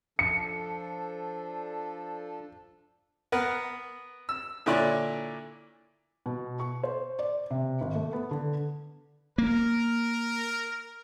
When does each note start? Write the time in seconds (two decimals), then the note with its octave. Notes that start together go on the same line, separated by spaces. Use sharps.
0.19 F3 D4 A4 C#7
3.32 B3 A#4 B4
4.29 E6
4.66 A#2 D3 E4 C#5 D5
6.26 B2
6.60 C#6
6.83 C5
7.19 D5
7.51 C3
7.81 G#1
7.95 A3
8.13 B3
8.31 D3
9.38 A#3 A#4